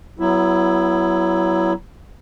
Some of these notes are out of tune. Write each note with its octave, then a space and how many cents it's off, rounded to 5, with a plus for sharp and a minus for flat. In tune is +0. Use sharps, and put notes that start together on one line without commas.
F#3 +25 B3 +0 E4 +15